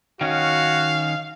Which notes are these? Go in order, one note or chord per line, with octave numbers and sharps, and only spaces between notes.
D#3 C#4 F#4 F5